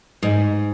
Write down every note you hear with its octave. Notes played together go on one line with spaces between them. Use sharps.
G#2